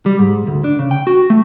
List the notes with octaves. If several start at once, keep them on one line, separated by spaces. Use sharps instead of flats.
G3
G#2
D2
D4
C#3
G5
F#4
A3